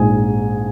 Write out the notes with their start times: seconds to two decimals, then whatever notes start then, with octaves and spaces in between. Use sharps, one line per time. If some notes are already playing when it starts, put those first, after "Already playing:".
Already playing: A#1 G#2 G#3 G#4 G#5